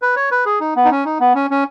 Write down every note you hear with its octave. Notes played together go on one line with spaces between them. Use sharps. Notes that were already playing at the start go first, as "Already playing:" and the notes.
B4
C#5
B4
G#4
D#4
B3
D#4
C#4
D#4
B3
C#4
C#4